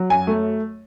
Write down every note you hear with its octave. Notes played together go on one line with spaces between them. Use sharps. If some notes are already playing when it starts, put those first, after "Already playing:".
Already playing: F#3
F#2 G#5
A3